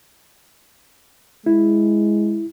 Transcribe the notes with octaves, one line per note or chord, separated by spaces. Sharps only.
G#3 E4